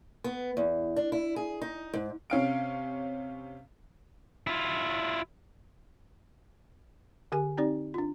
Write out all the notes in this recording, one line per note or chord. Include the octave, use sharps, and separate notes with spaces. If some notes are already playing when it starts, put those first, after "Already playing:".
B3
E2
D4
E4
G#4
D#4
G#2
C3 C#4 F5 D7
E4 F4
D3 G4 A#4 G#5
C4 D#4 G4 D5
D4 F4